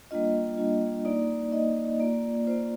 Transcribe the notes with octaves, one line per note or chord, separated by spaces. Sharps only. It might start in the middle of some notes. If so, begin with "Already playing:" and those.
G3 A#3 D4 F4 D#5
G3 A#3 D4 F4
A#3 D#4 D5
A#3 D#4 D#5
A#3 F4 D5
A#3 F4 C5